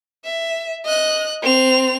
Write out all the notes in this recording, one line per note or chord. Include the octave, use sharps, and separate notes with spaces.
E5
D#5 F#6
C4 F7